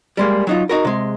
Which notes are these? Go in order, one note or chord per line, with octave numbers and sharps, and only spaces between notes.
G3 G#3 A#3
F#3 D#4 F4
D#4 F#4 A#4
C3 G#3